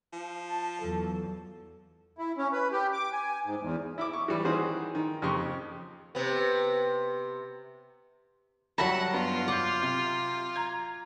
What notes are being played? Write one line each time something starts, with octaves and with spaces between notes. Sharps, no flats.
F3
A5
E2 F#3 A4
E4
C#4
B4
G4
D6
G#5
G#2
E2
E4 E5 D6
C#6
E3 G3
D#3 E3 C#4 F#4 G#4 C5
D#3
F2 C#3 G4 C6 C#6
C3 B3
F#3 G3 E5 F#5 A5 B5 A#6
G2 B3 F4
F#5 D6 G6
C3
A#5 G#6